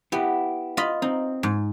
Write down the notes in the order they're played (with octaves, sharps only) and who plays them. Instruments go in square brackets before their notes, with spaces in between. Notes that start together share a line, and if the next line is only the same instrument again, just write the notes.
[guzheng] B3 [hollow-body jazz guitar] E4 G4
[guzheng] F4 D#5 B5
[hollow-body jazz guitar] C4 [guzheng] D#4
[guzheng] G#2